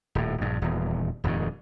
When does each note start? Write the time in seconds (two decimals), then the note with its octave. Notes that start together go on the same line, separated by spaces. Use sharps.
0.15 D#1 A2
0.41 A#1 G2
0.62 D#1 E2
1.24 D#1 F2 G#2 D#3